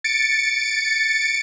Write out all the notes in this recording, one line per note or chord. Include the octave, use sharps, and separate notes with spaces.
A6 C#7 D7